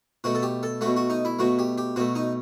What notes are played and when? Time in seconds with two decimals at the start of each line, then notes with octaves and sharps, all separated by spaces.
0.24 B2 A3 F#4
0.35 A4
0.43 G4
0.63 A4
0.81 B2 A3 F#4
0.96 F#4
1.10 D#4
1.25 E4
1.39 B2 A3 F#4
1.59 G4
1.78 G4
1.96 B2 A3 F#4
2.15 D#4